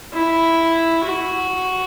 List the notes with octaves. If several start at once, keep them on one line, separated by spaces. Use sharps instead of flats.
E4
F#4